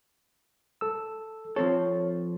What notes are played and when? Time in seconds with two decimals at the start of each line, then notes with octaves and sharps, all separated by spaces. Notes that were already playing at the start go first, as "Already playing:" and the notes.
0.81 A4 E6
1.56 F3 C4 A4 C#5